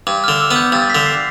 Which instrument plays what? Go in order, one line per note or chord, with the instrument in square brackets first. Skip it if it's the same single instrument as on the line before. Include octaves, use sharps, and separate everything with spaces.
[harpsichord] G2 [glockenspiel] D6
[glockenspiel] F6
[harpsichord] D3
[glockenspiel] E6
[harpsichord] B3
[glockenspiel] G6
[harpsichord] G2 [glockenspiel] A6
[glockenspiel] B6
[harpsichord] D3
[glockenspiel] C7